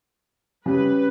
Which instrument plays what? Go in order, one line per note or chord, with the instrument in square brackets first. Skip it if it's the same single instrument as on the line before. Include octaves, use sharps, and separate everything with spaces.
[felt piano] C#3 G3 [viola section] B4